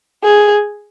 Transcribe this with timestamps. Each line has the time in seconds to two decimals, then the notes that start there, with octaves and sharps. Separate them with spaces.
0.24 G#4